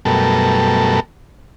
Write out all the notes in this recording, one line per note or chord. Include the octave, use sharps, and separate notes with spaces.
F#2 B2 G3 A3 A4 A#4